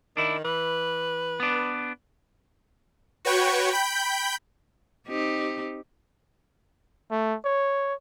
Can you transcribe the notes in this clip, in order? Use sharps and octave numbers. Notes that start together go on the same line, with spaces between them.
D#3 D4 E4
E3 B4
B3 D4
F#4 B4 C#5 G5 C#6
G5 B5 G6
C4 D#4 G4
A3
C#5